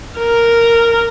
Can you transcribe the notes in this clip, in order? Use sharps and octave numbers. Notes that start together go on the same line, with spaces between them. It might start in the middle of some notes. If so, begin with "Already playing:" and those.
A#4